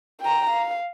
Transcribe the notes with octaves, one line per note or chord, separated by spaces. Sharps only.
G5 A#5
F5